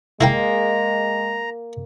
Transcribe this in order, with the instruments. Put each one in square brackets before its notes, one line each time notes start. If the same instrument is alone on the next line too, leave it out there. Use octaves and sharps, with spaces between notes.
[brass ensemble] G#3 [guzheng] A#3 [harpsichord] E4 A#4 G5 [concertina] A#5